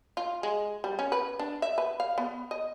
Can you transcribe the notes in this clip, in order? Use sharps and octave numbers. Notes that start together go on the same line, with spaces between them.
F4
G#3
G3
C#4
B4
D4
E5
B4
F5
B3
D#5